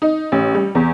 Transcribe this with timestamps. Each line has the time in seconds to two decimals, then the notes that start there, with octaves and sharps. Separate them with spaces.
0.02 D#4
0.32 A1
0.55 G3
0.75 E2